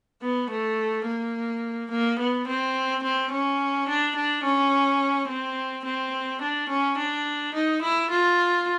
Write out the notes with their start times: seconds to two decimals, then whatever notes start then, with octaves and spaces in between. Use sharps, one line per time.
0.22 B3
0.50 A3
1.06 A#3
1.91 A#3
2.19 B3
2.47 C4
3.03 C4
3.31 C#4
3.88 D4
4.16 D4
4.44 C#4
5.28 C4
5.85 C4
6.42 D4
6.69 C#4
6.98 D4
7.54 D#4
7.82 E4
8.11 F4